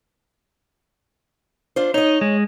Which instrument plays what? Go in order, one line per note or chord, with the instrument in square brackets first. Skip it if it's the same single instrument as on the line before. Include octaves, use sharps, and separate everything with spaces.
[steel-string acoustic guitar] D4 F4 C5
[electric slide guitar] D#4 [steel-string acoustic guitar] C#5 D#5
[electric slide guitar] G#3